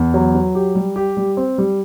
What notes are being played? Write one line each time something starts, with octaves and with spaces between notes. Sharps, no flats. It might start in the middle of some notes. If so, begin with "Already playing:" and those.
Already playing: E2
F#3
F#3
G4
G3
G4
G3
C4
G3